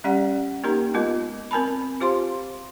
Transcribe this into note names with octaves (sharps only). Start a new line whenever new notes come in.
G3 C#4 G4 D5 F#5
A#3 D#4 G4 A#4 A#5
G#3 B3 F4 A#4 D#5
C4 A#4 G#5 A5 B5
F4 G4 C5 F5 C6